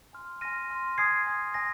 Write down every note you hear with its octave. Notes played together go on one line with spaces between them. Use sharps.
G#5 C6 F6
G#5 C6 F6 A#6 D#7
G#5 C6 F6
G#5 D#6 G#6 C7
G#5 D#6
G#5 D#6 A#6